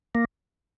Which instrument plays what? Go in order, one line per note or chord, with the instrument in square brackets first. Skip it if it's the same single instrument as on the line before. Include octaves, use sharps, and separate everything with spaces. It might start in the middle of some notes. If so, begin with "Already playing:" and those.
[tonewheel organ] A#3